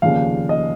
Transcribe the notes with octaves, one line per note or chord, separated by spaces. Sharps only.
F1 D#2 C#3 F3 F5
D#5